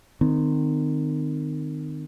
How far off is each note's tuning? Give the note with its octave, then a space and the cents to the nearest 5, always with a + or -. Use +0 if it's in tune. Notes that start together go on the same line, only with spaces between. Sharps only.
D#3 -25 C4 -35